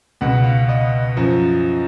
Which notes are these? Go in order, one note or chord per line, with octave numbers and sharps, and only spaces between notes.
C#2 B2 F#5
F5
D#5
F#2 F3